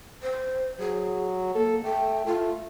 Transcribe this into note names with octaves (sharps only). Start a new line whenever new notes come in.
C5
F#3 G#4
A#3 A4
A3 G5
A3 F4